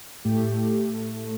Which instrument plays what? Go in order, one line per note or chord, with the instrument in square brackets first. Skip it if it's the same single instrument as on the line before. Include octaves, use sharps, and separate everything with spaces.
[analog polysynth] A2 A3 G4